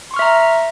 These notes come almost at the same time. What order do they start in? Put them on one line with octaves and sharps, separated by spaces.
C6 C#6 F6 E5 A#5